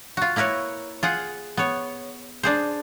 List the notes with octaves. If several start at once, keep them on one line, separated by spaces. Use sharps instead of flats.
F4 F#4
A#3 E4 A#4 B4 C#5
F4 G#4 F#5
B3 C#5
D4 G#4 C5